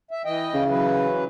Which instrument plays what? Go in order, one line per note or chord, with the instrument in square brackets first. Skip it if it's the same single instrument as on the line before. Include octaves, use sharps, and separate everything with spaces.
[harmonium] E5
E3 D#5 G5
[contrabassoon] C#3
[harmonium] E3 F#3 B4